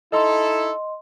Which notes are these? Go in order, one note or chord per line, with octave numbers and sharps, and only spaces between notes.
D#4 E4 A4 D#5 C6